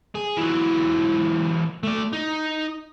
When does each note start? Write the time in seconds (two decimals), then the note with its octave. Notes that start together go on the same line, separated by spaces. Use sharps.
0.15 G#4
0.37 E3 F#3
1.83 A3 D5
2.13 D#4